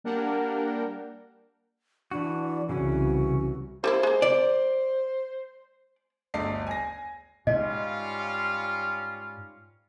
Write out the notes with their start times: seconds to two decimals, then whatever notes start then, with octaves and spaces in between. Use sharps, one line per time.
0.04 G3 A#3 D4 A#4 F#5 G5
2.11 E3 D4 F#4
2.69 C2 C#3 E3 C#4 F#4
3.84 G3 A#3 E4 C5
4.03 G#3 A#3
4.22 D5
6.34 G1 D2 D5 D#5 C7
6.67 G#5 A#6
7.47 G#2 G3 C#4 F4 D#5